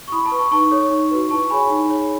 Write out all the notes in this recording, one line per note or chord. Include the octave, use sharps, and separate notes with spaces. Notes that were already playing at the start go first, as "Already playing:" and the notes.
C#6
E4 B5 D#6
A5 C#6
B4
A5 C#6
D#4 A5 C#6
A4 C#5
D#4
F#4 B4
E4 A5 C#6
G#4 C#5 G#5 B5
D#4
G#4 C#5